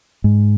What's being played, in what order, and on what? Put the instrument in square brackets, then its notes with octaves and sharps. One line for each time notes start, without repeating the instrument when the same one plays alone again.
[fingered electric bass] G#2